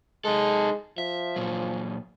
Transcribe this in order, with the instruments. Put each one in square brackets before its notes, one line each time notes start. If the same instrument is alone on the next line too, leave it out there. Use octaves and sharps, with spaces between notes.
[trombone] G#3 [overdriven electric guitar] D#4 A4
[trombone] F3 [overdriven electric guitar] E5
[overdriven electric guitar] A#2 F#3